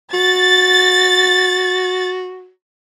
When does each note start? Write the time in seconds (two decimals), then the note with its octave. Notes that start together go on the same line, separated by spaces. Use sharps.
0.14 F#4 A6